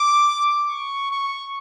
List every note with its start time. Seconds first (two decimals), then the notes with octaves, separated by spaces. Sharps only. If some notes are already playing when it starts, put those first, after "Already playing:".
Already playing: D6
0.69 C#6
1.11 C#6